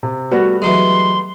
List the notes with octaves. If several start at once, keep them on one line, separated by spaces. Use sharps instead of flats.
C3
G3 A3 B3 F#4
E3 F#3 G#3 C6